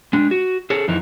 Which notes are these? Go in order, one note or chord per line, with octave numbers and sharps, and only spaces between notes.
G#3 D4
F#4
G#4 A4 C#5
F2 E3 D#4